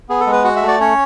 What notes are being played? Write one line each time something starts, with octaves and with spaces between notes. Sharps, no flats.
B3 G#4
A4
G#3
B4
F#4 F#5
E5
A3
D5
C#4 C#5